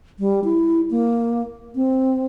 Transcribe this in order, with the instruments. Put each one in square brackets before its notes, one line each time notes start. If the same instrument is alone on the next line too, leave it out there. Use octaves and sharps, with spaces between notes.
[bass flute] G3
E4
A#3
C4